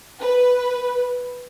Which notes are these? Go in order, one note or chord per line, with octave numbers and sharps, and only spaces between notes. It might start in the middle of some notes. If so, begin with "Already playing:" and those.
B4